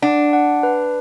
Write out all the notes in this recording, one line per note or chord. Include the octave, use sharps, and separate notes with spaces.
D4 F#5
F#5
B4